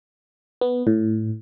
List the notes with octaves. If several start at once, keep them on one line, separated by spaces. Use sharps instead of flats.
B3
A2